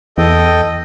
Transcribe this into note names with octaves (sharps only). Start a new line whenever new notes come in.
E2 A4 D#5 G5